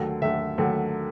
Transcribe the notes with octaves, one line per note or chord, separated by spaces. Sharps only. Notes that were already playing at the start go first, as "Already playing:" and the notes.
Already playing: D#2 D3 F#3 A3
D#2 D3 F#3 A3 E5
D#2 D3 F#3 A3